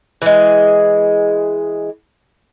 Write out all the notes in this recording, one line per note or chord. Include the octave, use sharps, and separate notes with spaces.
E3 G#3